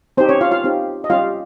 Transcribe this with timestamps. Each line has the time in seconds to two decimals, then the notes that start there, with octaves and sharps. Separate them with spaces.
0.17 C4 D#4 G4 C5
0.29 C#4 C#5
0.41 F4 F5
0.51 F4 F5
0.64 C4 D#4 G4
1.04 D#5
1.10 G3 C#4 F4 G4 F5